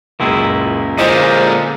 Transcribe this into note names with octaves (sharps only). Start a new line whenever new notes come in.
C#2 F#2 A#2 G#3 E4
A#2 D3 G#3 C#4 F4 C5 D#5